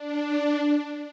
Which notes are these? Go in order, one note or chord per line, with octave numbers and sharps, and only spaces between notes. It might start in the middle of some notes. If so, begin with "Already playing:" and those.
Already playing: D4